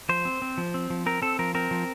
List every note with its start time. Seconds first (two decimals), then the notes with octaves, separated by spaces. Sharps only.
0.09 F3 C5
0.25 C4
0.42 C4
0.58 F3
0.74 C4
0.90 F3
1.06 C4 A#4
1.22 C4 A4
1.39 F3 A#4
1.55 C4 A#4
1.71 F3